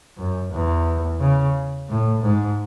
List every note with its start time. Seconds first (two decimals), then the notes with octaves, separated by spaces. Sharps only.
0.17 F#2
0.52 E2
1.20 C#3
1.89 A2
2.22 G#2